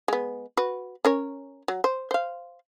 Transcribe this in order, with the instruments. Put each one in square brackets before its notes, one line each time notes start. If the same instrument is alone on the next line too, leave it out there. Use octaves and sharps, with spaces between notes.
[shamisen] G#3 B3
F#4 B4
C#4 A#4 C#5
F#3
C5
C5 F5